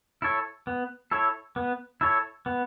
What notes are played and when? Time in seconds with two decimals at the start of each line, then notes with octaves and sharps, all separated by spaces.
0.22 E4 A4 C#5
0.67 B3
1.11 E4 A4 C#5
1.56 B3
2.01 E4 A4 C#5
2.46 B3